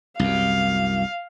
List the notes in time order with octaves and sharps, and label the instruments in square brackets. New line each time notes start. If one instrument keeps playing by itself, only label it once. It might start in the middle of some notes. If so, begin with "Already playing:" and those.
[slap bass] C2 F#2 [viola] F5